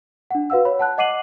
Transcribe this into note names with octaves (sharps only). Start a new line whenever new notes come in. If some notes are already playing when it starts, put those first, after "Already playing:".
D4 F#5
F#4 B4 F5 F#5 E6
C#5 B5
F#5 A5 F#6
D#5 F#5 D6 C7 D#7 F#7